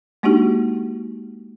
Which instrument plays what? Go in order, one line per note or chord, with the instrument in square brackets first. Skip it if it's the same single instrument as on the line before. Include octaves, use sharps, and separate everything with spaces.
[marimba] G#3 A#3 D4 D#4 F#4 G4